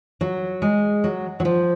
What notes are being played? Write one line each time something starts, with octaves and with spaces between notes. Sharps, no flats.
F#3
G#3
F#3
F#3
F3